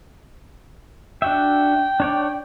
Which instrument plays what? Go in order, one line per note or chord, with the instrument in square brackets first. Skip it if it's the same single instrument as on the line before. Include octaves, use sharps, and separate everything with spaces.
[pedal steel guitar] D4 F#4 E5 [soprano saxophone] G5
[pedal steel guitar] D4 C#5 D5